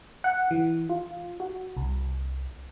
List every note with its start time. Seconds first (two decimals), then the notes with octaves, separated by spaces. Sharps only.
0.24 F#5
0.51 E3
0.89 F4
1.40 F#4
1.77 C2